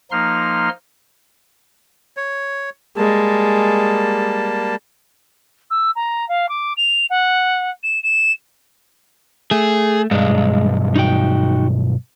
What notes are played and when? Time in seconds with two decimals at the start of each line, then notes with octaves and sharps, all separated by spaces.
0.11 F3 A#3 D#4 C6 F6
2.17 C#5
2.97 G3 G#3 A#3 A5
5.70 E6
5.96 A#5
6.29 F5
6.49 D6
6.77 F7
7.10 F#5
7.83 E7
8.03 E7
9.51 A3 G#4
10.11 B1 G2 G#3
10.96 D#4 F#4 G5